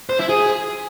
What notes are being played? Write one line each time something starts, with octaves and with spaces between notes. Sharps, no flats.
C5
E4
G#4